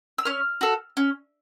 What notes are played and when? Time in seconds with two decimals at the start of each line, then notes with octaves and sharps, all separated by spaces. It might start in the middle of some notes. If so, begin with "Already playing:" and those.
0.18 E6
0.25 C#4 F6
0.61 F#4 A4
0.97 C#4